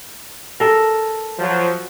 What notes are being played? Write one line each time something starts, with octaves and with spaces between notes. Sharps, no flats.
A4 A#4
F3 F#3